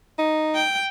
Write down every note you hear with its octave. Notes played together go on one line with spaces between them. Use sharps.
D#4
G5